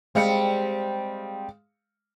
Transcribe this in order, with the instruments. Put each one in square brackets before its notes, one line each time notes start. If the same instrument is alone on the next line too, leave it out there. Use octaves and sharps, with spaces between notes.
[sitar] G3 C4 [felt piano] G#3 F5 C#7